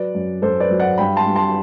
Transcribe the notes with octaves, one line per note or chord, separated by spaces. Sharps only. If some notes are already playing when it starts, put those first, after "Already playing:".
Already playing: F#3 B4 D5
F#2
F#2 A4 C5
B4 D5
F#3
D5 F#5
G2 G5 B5
A5 C6
G2
A5 C6